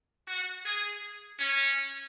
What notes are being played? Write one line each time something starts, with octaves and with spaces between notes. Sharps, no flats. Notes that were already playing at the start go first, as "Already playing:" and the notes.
F#4
G#4
C#4